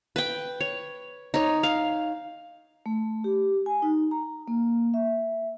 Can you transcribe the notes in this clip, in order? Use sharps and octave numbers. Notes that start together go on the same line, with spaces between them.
B4 G5
C#5
D#4 C#5
F5
A3
G4
G#5
D#4
A#5
A#3
E5